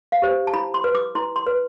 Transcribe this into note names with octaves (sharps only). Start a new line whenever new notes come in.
F5
G4 C5
A5
E4 B5
C6
B4
D6
E4 C6
C6
B4